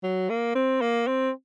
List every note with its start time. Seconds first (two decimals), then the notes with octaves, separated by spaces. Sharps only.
0.03 F#3
0.30 A#3
0.55 C4
0.81 A#3
1.07 C4